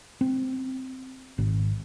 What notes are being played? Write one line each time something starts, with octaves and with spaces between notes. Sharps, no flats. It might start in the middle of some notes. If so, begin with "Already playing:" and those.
C4
G#1